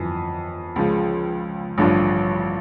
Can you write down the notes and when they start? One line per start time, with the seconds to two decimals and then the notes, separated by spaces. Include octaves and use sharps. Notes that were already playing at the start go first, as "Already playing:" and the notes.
Already playing: G1 F2 E3
0.76 C#2 C#3 F3
1.78 A1 G2 D3 F3